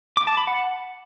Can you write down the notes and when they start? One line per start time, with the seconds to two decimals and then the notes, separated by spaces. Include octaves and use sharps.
0.17 D6
0.27 A5
0.37 B5
0.47 F#5